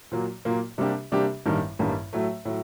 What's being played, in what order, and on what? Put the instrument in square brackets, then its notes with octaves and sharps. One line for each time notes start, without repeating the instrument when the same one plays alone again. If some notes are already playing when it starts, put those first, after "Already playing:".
[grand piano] A#2 F#3 A#3
A#2 F#3 A#3
C3 G3 A#3 D4 G4
C3 G3 A#3 D4 G4
A1 G2 D#3 G3 A#3
A1 G2 D#3 G3 A#3
A2 F#3 A3
A2 F#3